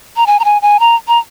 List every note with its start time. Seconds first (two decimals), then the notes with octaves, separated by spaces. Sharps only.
0.16 A#5
0.27 G#5
0.39 A#5
0.45 G#5
0.62 G#5
0.80 A#5
1.08 A#5